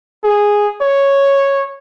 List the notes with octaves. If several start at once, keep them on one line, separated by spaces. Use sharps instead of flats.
G#4
C#5